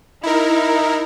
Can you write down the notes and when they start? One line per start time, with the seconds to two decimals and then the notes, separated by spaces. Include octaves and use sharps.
0.23 D#4 E4 A#4